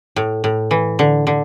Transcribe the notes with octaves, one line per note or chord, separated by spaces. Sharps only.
A2
A2
E3
D3
D3